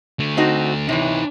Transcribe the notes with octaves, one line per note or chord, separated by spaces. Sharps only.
D3 A3
C4 D#4 F#4
C3 E3 D#4 C#5